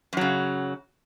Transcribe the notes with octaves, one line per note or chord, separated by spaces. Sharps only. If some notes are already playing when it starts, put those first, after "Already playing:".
F#2 C#3 F#3